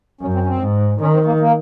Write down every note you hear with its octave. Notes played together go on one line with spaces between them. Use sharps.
F#2 C#4
C4
C#4
C4
G#2
D#3 C#4
C4
A#3
A#3